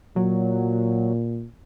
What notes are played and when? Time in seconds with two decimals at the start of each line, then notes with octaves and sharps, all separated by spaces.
0.16 A#2 F#3